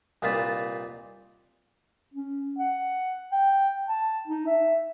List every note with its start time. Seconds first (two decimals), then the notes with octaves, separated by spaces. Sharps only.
0.22 C2 A#2 D#4 F4 B4 A5
2.14 C#4
2.58 F#5
3.32 G5
3.88 A5
4.27 D#4
4.47 E5